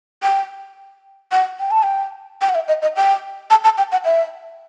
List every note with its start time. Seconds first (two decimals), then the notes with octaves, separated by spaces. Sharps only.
0.23 G5
1.32 F#5
1.60 G5
1.71 A5
1.83 G5
2.41 G5
2.49 F#5
2.55 E5
2.68 D#5
2.82 D#5
2.96 G5
3.50 A5
3.64 A5
3.78 G5
3.92 F#5
4.05 E5